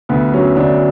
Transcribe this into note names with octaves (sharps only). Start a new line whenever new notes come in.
D2 B3
F#3 C#4
D2 D4